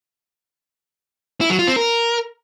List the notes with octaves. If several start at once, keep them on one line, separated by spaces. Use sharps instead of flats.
E4
F#3
F4
C4
A#4